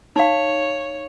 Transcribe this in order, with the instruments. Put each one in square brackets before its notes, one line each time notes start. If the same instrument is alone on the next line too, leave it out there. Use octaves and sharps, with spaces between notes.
[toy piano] D#4 F5 [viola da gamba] C#5